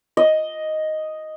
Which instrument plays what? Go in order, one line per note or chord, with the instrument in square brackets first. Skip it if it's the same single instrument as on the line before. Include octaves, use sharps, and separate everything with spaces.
[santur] D#5